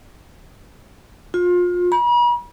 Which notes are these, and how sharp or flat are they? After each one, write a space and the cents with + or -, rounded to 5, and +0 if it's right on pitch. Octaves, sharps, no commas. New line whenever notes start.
F4 +30
B5 -45